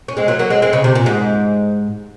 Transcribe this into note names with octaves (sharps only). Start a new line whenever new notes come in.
C#4
G#3 C4
F#3 A#3
F#3 A#3
G#3 C4
G#3 C4
C#3
C3
A#2
G#2